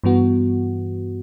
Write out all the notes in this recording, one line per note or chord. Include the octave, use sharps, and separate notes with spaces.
G2 E3 B3 F#4